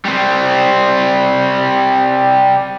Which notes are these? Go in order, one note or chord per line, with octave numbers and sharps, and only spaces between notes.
G3 C4